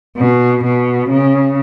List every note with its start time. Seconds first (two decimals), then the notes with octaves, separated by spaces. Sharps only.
0.17 B2
0.64 B2
1.10 C#3